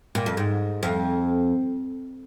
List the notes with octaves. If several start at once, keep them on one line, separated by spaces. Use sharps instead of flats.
A#2
F2
G#2
F2